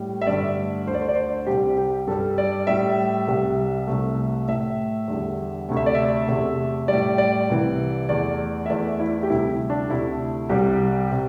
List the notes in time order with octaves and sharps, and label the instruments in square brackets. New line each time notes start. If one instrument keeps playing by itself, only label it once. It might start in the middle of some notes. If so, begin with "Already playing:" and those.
Already playing: [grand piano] A2 G3
E5
G2 D3 A3 D5
D2 D3 A3 C5
D5
C5
D5
C5
C2 C3 G3 G4
G4
G2 G3 A4
D5
A2 G3 E5
C2 C3 G3
C2 C3 A3
A2 A3 E5
E2 D3 G3
D2 C3 A3
E5
D5
E5
E2 C3 A3
A2 G3 D5
D5
C2 C3 E3
E2 E3 A3 D5
E5
E2 E3 A3 D5
E4
G4
D2 C3 G3 E4
D4
D2 C3 A3 E4
C2 C3 G3 G4
C3